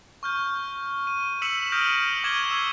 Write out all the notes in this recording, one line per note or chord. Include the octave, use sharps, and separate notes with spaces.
C#6 F6 G6
D#7
E6 B6 C#7 E7 F#7
D#6 F6 G6 A#6 D7 D#7
C#6 D6 F6 G#6 E7 G7
E6 C7